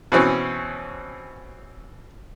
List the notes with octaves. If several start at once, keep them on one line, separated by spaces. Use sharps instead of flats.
B2 E3 C4 C#4